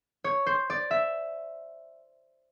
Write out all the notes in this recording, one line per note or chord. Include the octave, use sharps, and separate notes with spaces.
C#5
C5
D5
E5